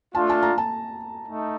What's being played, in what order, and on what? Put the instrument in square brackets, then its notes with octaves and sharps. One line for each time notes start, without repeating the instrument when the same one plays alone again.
[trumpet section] A3 D4 F4 [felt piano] A5
[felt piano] A5
A#5
A5
[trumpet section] A3 D#4